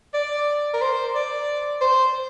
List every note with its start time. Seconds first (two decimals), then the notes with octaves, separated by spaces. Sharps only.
0.14 D5
0.74 A#4
0.81 C5
1.15 D5
1.81 C5